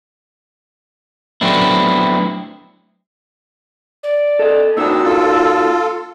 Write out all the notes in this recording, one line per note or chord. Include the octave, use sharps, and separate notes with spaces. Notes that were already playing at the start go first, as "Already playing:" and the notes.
F#3 A3 B3 C4 D4 E4
D5
A4 D#5
A#2 C4 D4 D#4 F#4 E6
F4 A4